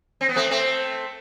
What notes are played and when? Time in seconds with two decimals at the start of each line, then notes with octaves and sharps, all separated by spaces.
0.21 C4
0.29 B3
0.36 A3 C4
0.51 A3 C4